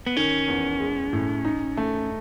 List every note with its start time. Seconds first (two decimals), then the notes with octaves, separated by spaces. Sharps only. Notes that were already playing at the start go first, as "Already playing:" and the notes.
0.07 B3
0.16 D#3 C#4
0.48 E2
0.80 G#3
1.13 A2
1.45 D#4
1.77 A3